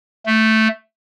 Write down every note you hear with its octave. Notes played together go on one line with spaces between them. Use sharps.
A3